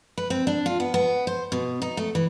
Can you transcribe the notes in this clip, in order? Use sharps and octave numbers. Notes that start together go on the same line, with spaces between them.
B4
C4
D4
F4
B3
B3
C5
B2
D#4
A3
E3